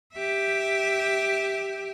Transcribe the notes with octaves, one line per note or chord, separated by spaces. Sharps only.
G4 E5